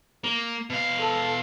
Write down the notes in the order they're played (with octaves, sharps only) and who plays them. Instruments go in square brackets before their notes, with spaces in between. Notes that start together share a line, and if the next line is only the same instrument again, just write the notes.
[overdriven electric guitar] A#3
B2 F5
[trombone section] A4